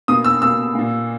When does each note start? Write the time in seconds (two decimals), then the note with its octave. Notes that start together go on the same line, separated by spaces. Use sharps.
0.08 B2 A#3 D#6
0.25 E6
0.42 B2 A#3 E6
0.75 A#2 A#3